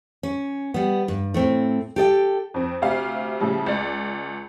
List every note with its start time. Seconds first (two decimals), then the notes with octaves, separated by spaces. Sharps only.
0.23 C#4
0.74 G3 B3
1.08 G2
1.34 A2 A3 C4
1.96 G4 A4 D#5 G5
2.54 F2 C4
2.82 D2 C3 F5
3.40 A2 C#3 F3 G3
3.66 C#2 D5